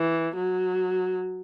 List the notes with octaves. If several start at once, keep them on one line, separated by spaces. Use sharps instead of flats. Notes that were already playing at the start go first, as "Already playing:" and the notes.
Already playing: E3
F#3